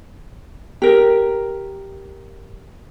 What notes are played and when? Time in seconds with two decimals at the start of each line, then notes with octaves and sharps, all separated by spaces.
0.82 G4 A#4